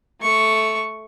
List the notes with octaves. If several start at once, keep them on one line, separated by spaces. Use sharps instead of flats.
A3 C#6